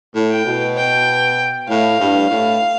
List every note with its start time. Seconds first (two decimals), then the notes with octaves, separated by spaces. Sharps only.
0.15 A2
0.30 G5
0.46 B2
0.77 G5
1.69 A2 F5
2.00 G2
2.30 A2